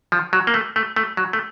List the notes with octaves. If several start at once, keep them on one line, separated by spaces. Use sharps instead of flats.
F3
F#3
A#3
A3
A3
A3
F#3
A3